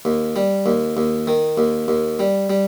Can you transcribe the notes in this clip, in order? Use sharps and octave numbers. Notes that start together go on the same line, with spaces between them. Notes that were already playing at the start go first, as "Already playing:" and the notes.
D#2
G3
D#2
D#2
D#3
D#2
D#2
G3
G3